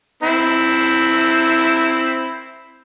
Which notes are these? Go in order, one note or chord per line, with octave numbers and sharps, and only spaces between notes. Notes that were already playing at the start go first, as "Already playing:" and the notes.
C4 E4